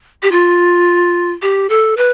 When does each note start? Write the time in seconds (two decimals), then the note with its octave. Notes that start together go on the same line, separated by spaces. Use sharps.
0.23 G4
0.32 F4
1.42 G4
1.70 A4
1.97 B4